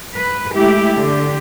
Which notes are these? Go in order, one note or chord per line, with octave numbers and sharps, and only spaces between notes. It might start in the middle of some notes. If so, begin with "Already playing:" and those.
B4
G#3 A3 E4 G4
D3 G4